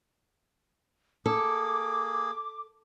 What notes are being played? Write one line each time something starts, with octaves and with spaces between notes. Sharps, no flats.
A#3 G#4 A4 D6